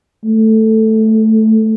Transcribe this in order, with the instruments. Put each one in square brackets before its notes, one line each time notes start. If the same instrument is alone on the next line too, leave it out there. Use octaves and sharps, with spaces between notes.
[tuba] A3